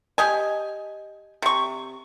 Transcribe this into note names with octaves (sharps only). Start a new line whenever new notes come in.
G4 D#5 G#5
C3 C#6